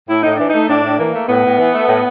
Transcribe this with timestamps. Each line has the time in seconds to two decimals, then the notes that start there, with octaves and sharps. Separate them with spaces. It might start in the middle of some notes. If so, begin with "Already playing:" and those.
0.09 A2 E4
0.23 A2 D#4
0.36 E3 D4
0.49 A3 D#4
0.69 A2 D4
0.83 A2
0.99 E3 A#3
1.13 A3
1.28 A2 B3
1.44 A2
1.59 E3
1.75 A3
1.89 A2